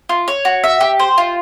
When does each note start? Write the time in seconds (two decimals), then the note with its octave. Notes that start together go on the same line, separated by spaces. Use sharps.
0.09 F4
0.28 C#5
0.45 F#4
0.64 E5
0.81 G4
1.00 C5
1.18 F4